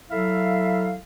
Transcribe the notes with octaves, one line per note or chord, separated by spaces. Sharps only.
F#3 E4 A4 E5 F5